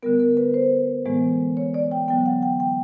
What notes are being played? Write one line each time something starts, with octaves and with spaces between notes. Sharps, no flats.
D3 G3 B3 A#4
A#4
B4
C5
A2 E3 G#3 B3
C#5
D5
G5
D3 F#3 B3 G5
F#5
G5
G5